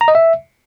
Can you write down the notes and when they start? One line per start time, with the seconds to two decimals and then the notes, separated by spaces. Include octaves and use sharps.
0.01 A#5
0.08 D#5
0.15 E5